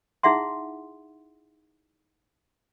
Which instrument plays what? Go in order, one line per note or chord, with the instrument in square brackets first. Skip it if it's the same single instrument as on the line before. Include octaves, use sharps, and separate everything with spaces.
[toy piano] D#4 E4 G#4 E5 F#5 C6